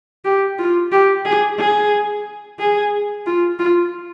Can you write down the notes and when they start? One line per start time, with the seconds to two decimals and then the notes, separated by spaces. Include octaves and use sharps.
0.24 G4
0.58 F4
0.92 G4
1.25 G#4
1.59 G#4
2.59 G#4
3.26 F4
3.59 F4